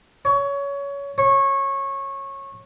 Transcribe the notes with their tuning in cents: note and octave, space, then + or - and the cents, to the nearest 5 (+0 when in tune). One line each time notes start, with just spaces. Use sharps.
C#5 +20
C#5 -20